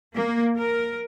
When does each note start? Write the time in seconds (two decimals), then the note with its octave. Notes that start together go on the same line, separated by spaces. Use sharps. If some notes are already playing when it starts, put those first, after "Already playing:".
0.14 A#3
0.57 A#4